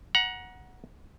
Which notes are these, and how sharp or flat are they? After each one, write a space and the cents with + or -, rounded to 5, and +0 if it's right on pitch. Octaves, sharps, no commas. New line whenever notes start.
F#5 -5 A#5 +30